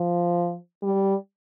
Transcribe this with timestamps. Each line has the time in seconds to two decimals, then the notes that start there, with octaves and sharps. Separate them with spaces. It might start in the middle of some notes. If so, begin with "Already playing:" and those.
Already playing: F3
0.82 G3